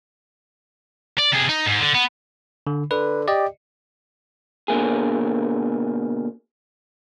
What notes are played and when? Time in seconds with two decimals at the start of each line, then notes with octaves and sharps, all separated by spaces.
1.18 D5
1.32 C3 G#4
1.49 D#4
1.66 G#2
1.80 D3
1.94 B3
2.67 D3
2.91 D3 B4
3.28 G4 D5 D#5
4.68 B2 D3 A#3 G#4